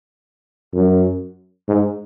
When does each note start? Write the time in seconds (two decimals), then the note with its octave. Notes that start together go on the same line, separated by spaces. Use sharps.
0.74 F#2
1.68 G#2